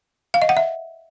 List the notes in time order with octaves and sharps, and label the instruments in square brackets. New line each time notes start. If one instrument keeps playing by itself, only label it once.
[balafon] F5
D#5
F#5
E5